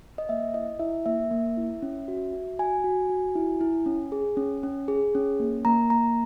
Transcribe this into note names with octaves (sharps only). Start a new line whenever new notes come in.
D#5
A#3 E5
E4 D#5
E4 E5
A#3 E5
A#3
E4
C#4
F#4
F#4
F#4 G#5
F#4
F#4
E4
E4
C#4
G#4
C#4
C#4
G#4
C#4
A#3
A#3 A#5
A#3 A#5